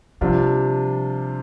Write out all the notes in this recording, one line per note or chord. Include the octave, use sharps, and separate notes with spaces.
C3 F3 G3 D4 F4